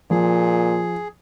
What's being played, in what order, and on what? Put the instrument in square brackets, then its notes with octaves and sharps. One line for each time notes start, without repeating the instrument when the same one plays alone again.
[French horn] A#2 [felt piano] F3 [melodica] G#4